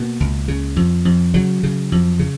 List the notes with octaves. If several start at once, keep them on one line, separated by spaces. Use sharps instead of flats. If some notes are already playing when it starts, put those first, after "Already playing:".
Already playing: B2 A#3
C#2
C#3
F2
F2
C#3 F#3
C#3
F2
C#3